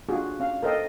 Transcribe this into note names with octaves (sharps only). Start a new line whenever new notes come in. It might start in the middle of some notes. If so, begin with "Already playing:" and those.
D4 F4 F#4 G#4
C#4 F5
A4 A#4 C5 D#5 G5